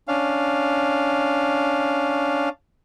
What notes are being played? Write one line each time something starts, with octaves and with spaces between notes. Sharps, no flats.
C#4 D4 F5